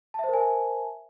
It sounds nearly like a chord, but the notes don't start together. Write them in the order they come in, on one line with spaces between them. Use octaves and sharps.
A5 E5 C5 A#4 G#5